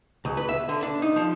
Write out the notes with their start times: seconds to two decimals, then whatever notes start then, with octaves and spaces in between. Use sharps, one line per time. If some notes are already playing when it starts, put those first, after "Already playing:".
0.25 C#2
0.37 B4
0.49 E5
0.69 D3
0.83 D4
1.02 D#4
1.16 F3